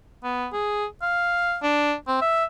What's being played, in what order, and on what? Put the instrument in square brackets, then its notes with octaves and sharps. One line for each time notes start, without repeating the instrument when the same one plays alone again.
[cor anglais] B3
G#4
F5
D4
C4
E5